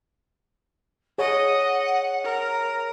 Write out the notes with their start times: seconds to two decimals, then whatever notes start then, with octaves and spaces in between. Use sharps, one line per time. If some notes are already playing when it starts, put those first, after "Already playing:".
1.18 G#4 C#5 D#5 F#5
2.24 A#4